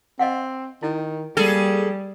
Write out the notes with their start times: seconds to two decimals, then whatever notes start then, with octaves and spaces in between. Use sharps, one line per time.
0.19 C4 D#5 F5 F#5
0.83 D#3 E4
1.37 G3 A#3 G#4 A4